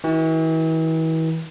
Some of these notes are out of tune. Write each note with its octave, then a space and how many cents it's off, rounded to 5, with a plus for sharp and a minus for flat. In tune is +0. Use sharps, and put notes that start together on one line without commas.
E3 -40 F#4 +0